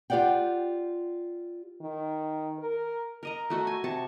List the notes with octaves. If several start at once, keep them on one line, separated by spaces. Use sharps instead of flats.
F4 G4 C5 D5 F#5 G5
D#3
A#4
A#4 D#5 A#5
A3 F#4 D#5
G#5
C3 A5 C#6